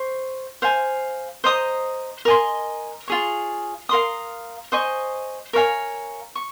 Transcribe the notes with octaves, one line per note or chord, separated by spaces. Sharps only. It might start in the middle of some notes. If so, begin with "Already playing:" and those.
Already playing: C5 C#6
C5 F5 G#5
C5 D#5 A#5 D#6
A#4 D#5 G#5 C6
F4 G#4 C#5
A#4 F5 C6 D#6
C5 D#5 G#5 C#6
A#4 C#5 F5 G#5
C#6